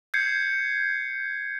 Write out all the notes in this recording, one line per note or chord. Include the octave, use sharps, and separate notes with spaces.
G6 G#6 C7 C#7